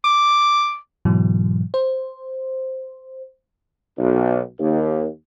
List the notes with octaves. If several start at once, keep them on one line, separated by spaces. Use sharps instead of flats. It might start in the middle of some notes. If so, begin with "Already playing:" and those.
D6
G#2 B2 E3 F#3
C5
B1
D#2